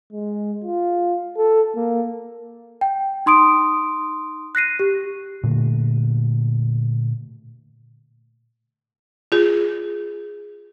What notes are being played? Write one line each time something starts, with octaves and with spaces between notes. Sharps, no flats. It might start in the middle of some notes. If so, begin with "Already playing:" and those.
G#3
F4
A4
A#3
G5
D#4 C6 D#6 D7
F#6 A#6 C7 D#7
G4
A#2 D3 A3
F4 G#4